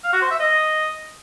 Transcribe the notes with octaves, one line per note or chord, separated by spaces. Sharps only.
F5
F#4
C5
E5
D#5